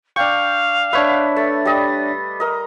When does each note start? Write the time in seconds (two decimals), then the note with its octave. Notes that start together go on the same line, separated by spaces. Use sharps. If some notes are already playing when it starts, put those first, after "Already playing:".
0.16 D4 F5 G5 C#6
0.93 D4 B4 C#5 E5
1.36 A3 A6
1.65 G3 D#5
2.40 A#4 D#5